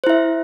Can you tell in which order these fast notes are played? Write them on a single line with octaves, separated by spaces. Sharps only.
C5 E4 E5